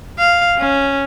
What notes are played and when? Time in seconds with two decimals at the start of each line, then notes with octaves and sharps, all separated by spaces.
0.19 F5
0.58 C#4